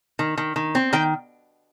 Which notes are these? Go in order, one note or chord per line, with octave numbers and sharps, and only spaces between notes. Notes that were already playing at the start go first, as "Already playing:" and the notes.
D#3
D#3
D#3
C4
D#3 G5